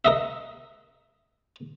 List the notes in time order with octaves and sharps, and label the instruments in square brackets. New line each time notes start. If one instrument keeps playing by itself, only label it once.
[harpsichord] A#4 D#5 E5